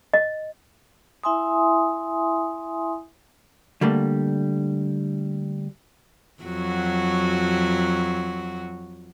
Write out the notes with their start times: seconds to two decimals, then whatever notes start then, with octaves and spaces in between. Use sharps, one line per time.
0.14 D#5
1.24 E4 E5 G#5 C6 D#6
3.81 D3 G3 A3 A#3
6.42 F2 F#3 F#4